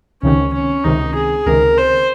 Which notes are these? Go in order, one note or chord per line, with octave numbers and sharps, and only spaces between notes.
C#2 C3 D#3 C#4
C#4
C#2 C3 D#3 D#4
G#4
C#2 C3 D#3 A#4
C5